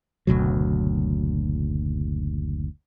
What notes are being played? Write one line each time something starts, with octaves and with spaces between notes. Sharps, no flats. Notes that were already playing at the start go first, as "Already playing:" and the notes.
F#1 D2 B2 F#3